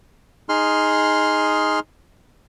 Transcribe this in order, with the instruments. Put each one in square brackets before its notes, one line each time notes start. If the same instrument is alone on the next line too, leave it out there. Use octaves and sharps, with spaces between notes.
[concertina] D#4 G#4 C6 F6